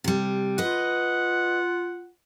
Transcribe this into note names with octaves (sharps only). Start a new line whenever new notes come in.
C3 G3
F4 B4 D#5 F#5